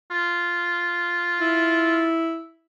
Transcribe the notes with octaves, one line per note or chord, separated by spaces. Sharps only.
F4
E4